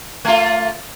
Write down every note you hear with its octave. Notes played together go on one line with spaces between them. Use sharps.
A3 F4